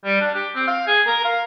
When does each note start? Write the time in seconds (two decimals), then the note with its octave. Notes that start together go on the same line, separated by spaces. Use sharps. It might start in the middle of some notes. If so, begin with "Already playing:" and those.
0.05 G3
0.21 D4
0.35 G4
0.55 C4
0.67 F5
0.87 G#4
1.07 A#4
1.24 F5